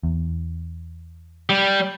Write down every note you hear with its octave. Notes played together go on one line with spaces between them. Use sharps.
E2
G3